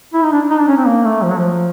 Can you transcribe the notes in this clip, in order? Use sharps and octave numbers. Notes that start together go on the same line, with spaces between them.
E4
D#4
D4
D#4
D4
C#4
C4
A#3
A3
F3
F#3
F3